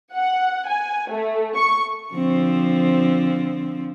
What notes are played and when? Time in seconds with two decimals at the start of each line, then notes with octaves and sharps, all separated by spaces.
0.14 F#5
0.67 G#5
1.10 A3
1.57 C#6
2.14 D3 F3 C4